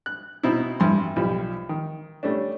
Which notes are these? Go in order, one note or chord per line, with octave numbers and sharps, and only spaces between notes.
F#6
B2 C4 D#4 E4
A1 G2 C6
B1 F3 G3
D#3
G3 A3 C#4 D4